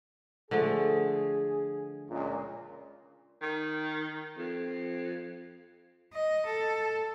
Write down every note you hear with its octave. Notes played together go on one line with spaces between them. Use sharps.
D3 F3 A3 G#4
C#2 A#2
D#3
F2
D#5
A4